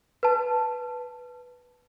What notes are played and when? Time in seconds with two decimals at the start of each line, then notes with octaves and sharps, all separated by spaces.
0.23 B4 A5